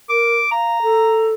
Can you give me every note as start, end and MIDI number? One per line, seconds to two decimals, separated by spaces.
0.10 0.36 70
0.10 0.51 86
0.51 0.82 77
0.51 1.31 82
0.83 1.34 69